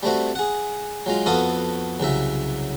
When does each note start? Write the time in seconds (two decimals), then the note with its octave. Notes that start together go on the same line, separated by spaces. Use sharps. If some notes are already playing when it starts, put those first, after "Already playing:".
0.03 G3 A3 C4 F#4
0.35 G#4 F#5
1.06 F#3 G#3 F4
1.26 F2 B3 F#4 A4 F5 D#6
2.00 C2 C#3 F#3 E5